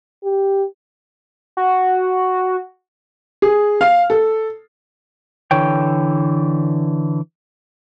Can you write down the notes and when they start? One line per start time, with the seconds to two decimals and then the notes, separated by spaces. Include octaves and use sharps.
0.24 G4
1.57 F#4
3.42 G#4
3.81 F5
4.10 A4
5.51 D3 E3 C#5 G5